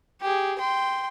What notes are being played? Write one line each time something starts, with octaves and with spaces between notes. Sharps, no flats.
G4 G#4
G5 C6